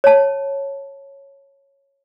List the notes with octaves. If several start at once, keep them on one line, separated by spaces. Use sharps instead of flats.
C#5 A5